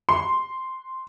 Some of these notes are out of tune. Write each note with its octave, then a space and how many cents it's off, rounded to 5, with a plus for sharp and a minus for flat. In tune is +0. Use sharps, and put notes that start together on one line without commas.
C6 +0